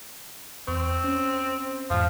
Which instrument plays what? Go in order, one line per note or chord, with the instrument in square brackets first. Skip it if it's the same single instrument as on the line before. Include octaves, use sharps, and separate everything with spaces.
[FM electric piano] E2 C#6 [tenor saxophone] C4
[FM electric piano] C#4
[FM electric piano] E2 G#2 [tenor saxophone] F3